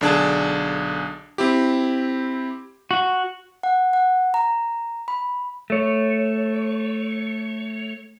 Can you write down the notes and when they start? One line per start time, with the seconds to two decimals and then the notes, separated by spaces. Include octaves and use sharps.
0.01 B1 D3 D4 G#4 A4 A5
1.38 C4 E4 G4
2.91 F#4
3.63 F#5
3.93 F#5
4.34 A#5
5.08 B5
5.70 A3 C#5